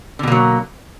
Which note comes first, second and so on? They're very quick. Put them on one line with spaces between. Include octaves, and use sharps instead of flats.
D3 B2 A#3 F#3